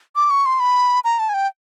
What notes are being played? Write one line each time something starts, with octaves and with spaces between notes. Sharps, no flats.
D6
C#6
C6
B5
A#5
A5
G#5
G5